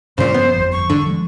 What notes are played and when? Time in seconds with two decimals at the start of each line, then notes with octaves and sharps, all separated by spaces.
0.18 G2 A#2 C#3 F3 C5
0.34 B3
0.56 G1 F2
0.72 C#6
0.90 G1 G2 D3 D4
1.06 F3 G#3